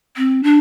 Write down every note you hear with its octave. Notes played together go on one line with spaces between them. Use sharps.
C4
D4